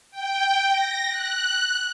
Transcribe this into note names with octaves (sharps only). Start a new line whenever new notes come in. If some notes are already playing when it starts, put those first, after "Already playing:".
G5
A#6
F#6